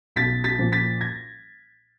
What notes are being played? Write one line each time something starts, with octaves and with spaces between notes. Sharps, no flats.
B1 A6 B6
A6 B6
A#2 F3
A6 B6
G#6 A#6